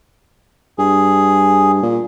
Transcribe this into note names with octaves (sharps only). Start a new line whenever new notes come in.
G2 G#4
A#2